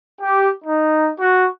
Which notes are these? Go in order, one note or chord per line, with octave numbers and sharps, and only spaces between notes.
G4
D#4
F#4